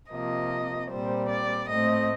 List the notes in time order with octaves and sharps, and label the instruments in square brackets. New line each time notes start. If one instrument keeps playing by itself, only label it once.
[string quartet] C3 F3 A#3 D#5
A#2 G3 C4 C5
D5
A2 A3 C4 D#5